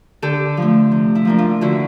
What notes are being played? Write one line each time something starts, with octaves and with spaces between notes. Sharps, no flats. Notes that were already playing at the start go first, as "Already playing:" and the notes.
D3 G4 A4
F3 A3
C3
E4
F3 A#3 D4
F4
D3 E4 F#4